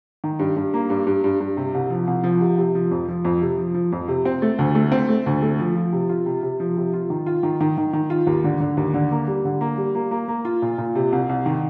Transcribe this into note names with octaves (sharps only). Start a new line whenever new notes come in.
D#3
G2
G2
A#3
G2
G2
G2
G2
C3
C2
F3
C2
F3
C3
C3
F3
F2
F3
F2
C3
F3
F3
F2
C3
C4
A3
D2
A3
C4
A3
D2
A3
F3
F3
C3
F4
C3
C3
F3
C3
F4
D#3
F4
D#3
D#3
D#3
D#3
F4
D#2
D3
D3
D#2
D3
A#3
G3
D3
A#3
G3
A#3
A#3
A#3
F4
A#2
A#2
C3
C2
C2
D#3